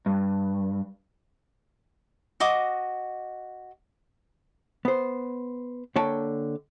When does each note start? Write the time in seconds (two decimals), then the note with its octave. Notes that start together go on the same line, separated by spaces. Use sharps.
0.06 G2
2.40 F#4 D#5 D6 D#6
4.85 B3 C5
5.96 D3 A#3 C#5 G5 A5